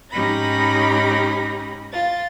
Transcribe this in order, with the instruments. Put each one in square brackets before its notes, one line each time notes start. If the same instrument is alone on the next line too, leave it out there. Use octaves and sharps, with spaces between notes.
[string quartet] G#2 C#4 D#4 G4 B5 A#6
F4 A6